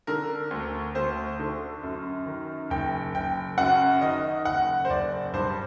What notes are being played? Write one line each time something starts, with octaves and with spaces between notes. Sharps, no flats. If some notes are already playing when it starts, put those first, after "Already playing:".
D3 A#4
D2
D2 C5
D3
F#2
D#3
F#1 G5
F#1 G5
F#2 F#5
D#3 D#5
F#1 F#5
C5
F#1 D5
G2 C5